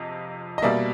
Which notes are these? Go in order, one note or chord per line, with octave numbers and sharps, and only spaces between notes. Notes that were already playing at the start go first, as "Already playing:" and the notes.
Already playing: F2 C3 D#5
D#5
B2 G3 A#3 D5 E5